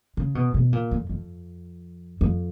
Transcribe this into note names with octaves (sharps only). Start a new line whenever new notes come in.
C#3
B2
B2
A#2
F2
F2
F2